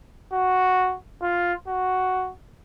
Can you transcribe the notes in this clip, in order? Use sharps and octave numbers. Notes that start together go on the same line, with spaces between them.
F#4
F4
F#4